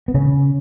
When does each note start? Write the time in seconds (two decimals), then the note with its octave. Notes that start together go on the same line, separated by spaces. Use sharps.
0.08 B3
0.14 E1 C#3 C#4